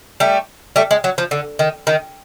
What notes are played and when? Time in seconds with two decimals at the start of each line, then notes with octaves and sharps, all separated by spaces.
0.20 G3 A3
0.76 G3 A3
0.91 G#3
1.04 F#3
1.18 F3
1.31 D3
1.59 D#3
1.87 D#3